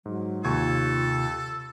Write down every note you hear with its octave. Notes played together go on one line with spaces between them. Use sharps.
G#2 F#3
D#2 C3 F4 A4 C#6 G#6